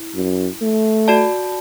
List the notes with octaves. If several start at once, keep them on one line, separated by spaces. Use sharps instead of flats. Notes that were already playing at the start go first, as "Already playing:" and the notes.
Already playing: E4
F#2
A3
F#4 D5 A5